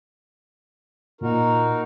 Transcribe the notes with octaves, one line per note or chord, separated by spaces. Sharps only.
A#2 D#4 F#4 A#4